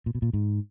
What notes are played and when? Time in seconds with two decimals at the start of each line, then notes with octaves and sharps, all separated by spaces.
0.06 A#2
0.15 B2
0.22 A#2
0.33 G#2